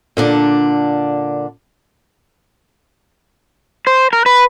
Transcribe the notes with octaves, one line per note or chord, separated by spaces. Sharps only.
A#2 D3 D4
C5
A#4
B4